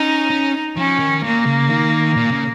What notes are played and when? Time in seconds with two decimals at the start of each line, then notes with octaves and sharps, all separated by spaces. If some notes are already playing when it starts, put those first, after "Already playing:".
Already playing: C#4 D#4
0.30 C#4
0.77 F3 C#4
1.00 D#3
1.24 A#2 A#3
1.47 C#3
1.70 D#3
2.16 A#2
2.32 C#3